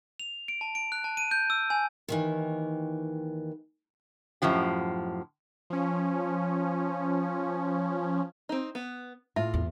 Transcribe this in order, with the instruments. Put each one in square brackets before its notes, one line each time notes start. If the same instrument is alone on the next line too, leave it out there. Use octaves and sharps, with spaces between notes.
[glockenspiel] F7
D7
A5
D7
F#6
A5
D#7
G6
E6
G#5
[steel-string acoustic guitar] D#2 D#3 E3
[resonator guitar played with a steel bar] F#2 A2 F3 G4
[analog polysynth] F3 C#4
[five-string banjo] C4 D#4
B3
[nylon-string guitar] A2 [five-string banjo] F4 [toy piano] E5
[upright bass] E2